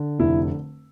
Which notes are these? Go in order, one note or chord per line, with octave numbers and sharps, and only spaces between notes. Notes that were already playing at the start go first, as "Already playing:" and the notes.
Already playing: D3
F1 E4